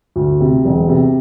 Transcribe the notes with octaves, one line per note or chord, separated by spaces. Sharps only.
D2
C3
E1
C3